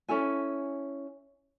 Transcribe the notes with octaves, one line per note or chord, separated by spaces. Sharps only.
C#4 E4 A4 G#5